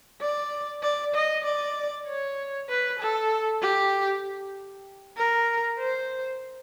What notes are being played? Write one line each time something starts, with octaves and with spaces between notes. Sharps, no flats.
D5
D5
D#5
D5
C#5
B4
A4
G4
A#4
C5